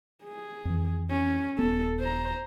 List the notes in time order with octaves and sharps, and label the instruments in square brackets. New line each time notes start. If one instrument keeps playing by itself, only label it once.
[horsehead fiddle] G#4
[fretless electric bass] F2 E3
[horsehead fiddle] C#4
[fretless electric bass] D#1 B3 [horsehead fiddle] A4
[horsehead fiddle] C5 A#5